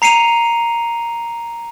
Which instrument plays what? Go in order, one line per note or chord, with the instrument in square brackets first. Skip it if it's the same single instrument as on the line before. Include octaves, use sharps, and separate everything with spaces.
[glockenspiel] A#5 C7 C#7 D#7 F7